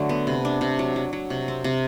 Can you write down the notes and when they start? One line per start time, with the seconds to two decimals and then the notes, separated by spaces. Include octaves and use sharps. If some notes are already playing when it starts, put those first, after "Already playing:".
Already playing: D3 F#3 A3 D4
0.09 B3
0.27 C3
0.45 D4
0.61 C3
0.79 F#3
0.96 F#3
1.13 F#3
1.30 C3
1.48 C4
1.64 C3